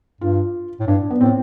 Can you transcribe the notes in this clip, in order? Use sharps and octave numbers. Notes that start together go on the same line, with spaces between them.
G2 F4
A2
G2 D4
B3
A2 C4